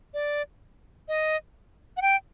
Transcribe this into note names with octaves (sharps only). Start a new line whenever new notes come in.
D5
D#5
F#5
G5